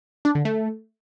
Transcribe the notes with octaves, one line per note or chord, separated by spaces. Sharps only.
D4
D3
A3